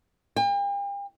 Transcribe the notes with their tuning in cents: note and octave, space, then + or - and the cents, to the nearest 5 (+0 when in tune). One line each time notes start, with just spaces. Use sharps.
G5 +40